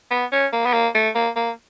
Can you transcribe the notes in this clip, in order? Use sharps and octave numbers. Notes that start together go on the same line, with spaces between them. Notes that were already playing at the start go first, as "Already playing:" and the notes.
B3
C#4
A#3
B3
A#3
A3
A#3
A#3